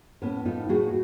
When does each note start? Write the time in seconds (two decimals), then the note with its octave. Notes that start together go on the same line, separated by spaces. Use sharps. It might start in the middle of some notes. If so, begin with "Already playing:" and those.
0.22 A2 B3 C#4
0.45 A2 D#4 F4
0.69 A2 F#4 G#4